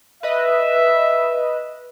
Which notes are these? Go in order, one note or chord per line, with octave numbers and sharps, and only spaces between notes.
B4 D#5 E5